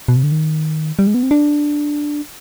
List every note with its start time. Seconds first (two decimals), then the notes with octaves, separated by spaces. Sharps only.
0.08 B2
0.16 C3
0.23 D3
0.32 D#3
0.99 G3
1.07 G#3
1.14 B3
1.23 C4
1.31 D4